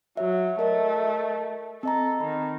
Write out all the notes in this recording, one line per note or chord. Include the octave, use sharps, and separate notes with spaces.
F#3 F#4 C#5 E5
A3 A#4 D#5 E5
C4 A4 D#5 A#5
D#3 B5